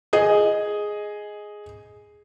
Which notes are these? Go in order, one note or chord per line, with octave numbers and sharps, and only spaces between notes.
G#4 D#5